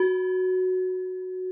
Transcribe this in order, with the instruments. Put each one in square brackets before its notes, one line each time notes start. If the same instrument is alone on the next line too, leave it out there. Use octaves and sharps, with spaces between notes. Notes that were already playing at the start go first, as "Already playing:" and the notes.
Already playing: [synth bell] F#4